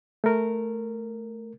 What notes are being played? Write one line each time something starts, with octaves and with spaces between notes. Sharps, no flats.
A3 A#4